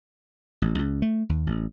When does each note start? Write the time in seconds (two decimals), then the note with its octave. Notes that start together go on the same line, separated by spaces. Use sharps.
0.62 A1
0.79 C#2
1.02 A3
1.29 D#2
1.47 A1